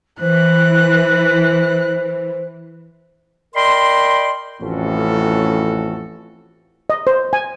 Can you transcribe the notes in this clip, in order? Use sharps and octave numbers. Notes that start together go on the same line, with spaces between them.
E3 C5 F#6
A#4 D5 D#5 G5 B5 C6
A1 F2 A2 C#4 F#4 A4
D#5
C5
G#5